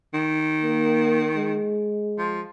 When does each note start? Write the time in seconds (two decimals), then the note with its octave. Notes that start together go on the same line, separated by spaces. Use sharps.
0.14 D#3
0.62 A#3
1.36 G#3
2.18 F3